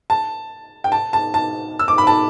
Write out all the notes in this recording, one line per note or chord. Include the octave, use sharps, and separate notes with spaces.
A5
G5
A5
A5
A5
E6
D6
B5
A5